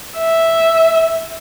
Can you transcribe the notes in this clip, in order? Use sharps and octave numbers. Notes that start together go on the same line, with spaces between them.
E5